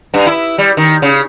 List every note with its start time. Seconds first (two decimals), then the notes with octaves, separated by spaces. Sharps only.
0.14 G2
0.27 E4
0.58 G3
0.77 D#3
1.02 C#3